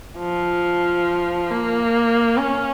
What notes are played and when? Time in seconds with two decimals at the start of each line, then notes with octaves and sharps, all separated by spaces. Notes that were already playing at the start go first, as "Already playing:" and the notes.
0.19 F3
1.51 A#3
2.37 C#4